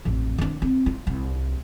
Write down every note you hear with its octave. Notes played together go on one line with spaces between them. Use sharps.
A1 F2
D#3 D4
C4
F4
C2